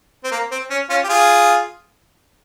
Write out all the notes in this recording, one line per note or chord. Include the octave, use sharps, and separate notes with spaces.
C4
A#3
C4
C#4
C#4 F4
G4
F4 G#4